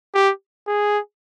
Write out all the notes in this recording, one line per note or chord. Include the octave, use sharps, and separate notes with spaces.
G4
G#4